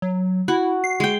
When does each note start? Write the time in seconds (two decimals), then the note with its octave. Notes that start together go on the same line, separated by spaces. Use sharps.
0.02 F#3
0.48 E4 F#4
0.84 C7
1.00 G#3 G5